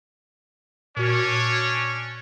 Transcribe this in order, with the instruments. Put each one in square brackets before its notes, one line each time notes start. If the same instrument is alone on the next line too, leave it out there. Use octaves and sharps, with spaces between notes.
[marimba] A#2 F#4 [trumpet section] C#4 D4 C#5